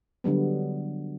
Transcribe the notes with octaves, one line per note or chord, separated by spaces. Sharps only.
D3 F#3 G3 B3